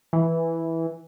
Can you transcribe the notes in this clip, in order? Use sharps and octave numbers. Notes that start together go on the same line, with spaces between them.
E3